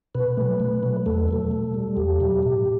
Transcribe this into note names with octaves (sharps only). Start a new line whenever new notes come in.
B2 B4
F#3 A3
B2
F#3 A3
E2 A4
B2 F#3 A3
B2
G3
E2 G4
B2 F#3
A2